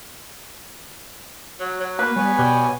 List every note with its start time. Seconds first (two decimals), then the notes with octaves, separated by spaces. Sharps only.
1.60 F#3 F#4
1.80 F#3
1.99 A#3 B4
2.16 G3 B3 C#5 G#5
2.39 B2 G3